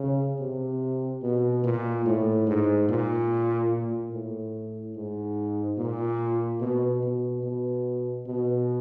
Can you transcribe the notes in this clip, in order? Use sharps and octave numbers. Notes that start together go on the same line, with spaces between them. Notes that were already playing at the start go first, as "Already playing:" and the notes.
Already playing: C#3
C3
B2
A#2
A2
G#2
A#2
A#2
A2
G#2
A#2
B2
B2
B2
B2